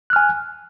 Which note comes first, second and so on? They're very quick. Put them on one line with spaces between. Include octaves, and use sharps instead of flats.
F#6 F6 G#5